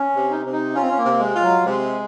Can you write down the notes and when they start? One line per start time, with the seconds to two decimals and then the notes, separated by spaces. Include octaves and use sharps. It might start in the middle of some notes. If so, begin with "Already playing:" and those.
Already playing: C#4
0.15 C3
0.31 D#4
0.46 C3
0.52 D#4
0.75 C#4 F4
0.82 C4
0.90 C#4
0.97 A#3
1.05 C3
1.19 G#3
1.35 F4
1.42 F#3
1.65 C3 G#3